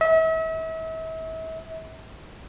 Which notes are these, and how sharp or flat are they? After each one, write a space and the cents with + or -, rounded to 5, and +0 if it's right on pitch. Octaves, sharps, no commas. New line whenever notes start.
E5 -40